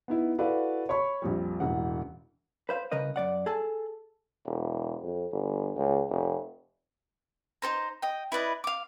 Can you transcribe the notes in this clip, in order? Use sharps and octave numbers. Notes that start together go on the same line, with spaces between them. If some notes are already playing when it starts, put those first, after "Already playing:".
B3 D#4 E4
E4 F#4 A4 B4 D5 F5
C#5 B5 C#6
A#1 F2 G3
E1 A1 F#5
B4 C5 F5
C2 C#3 A#4 B4 D#5
F#2 D5 F#5
G#4 A4 A5
E1
F2
G1
C#2
F1
D#4 A4 C5 A#5
D#5 G5
E4 B4 D5 D#5
F5 D6